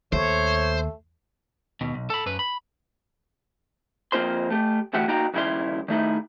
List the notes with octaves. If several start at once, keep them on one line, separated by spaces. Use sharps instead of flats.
D#2 A3 C5 C#5
D#2 B2
B1
A4 B5
F#2 B4
B5
F2 A#3 C4 F4 C5 C6
A3 G4
D2 E3 A3 F#4 G4 F#5
A#3 D#4 F#4 G5 A#5
D#2 C#3 G3 E4 C#5 C6
D#3 A3 D#4 E4